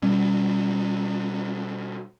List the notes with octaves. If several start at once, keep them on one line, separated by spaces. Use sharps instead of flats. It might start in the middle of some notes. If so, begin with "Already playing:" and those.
B2 G3 C#4